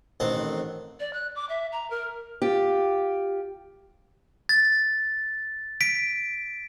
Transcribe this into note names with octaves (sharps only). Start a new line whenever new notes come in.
A1 D#3 C4 F#5 A5
D5
F#6
D6
E5
A#5
A#4
F4 G4
A6
B6 D7